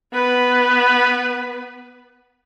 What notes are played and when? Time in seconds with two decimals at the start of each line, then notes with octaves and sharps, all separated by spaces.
0.13 B3 B4